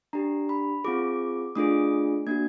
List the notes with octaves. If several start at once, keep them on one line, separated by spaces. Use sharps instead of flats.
D4 G4 A#5
B5
C4 F4 G#4 D6
A3 D4 F4 G#4 D#6
A#3 D4 F#4 G#6